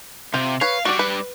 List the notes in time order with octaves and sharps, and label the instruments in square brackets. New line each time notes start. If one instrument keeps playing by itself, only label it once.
[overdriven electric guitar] C3 [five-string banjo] F4 G5
[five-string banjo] B4 C#5 [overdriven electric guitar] F5
[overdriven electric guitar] G3 D4 [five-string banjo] F#4 D5
[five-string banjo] B4